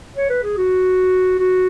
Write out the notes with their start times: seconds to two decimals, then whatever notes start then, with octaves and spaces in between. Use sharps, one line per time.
0.16 C#5
0.30 B4
0.43 G#4
0.57 F#4
1.39 F#4